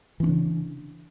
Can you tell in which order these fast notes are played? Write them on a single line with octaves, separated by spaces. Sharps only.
E3 C4 D4 C#3